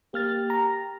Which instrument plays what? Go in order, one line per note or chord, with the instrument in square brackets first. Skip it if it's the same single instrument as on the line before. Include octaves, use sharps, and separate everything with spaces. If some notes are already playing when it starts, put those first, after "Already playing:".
[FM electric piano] A#3 F6 A6 [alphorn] G4
[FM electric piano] A#5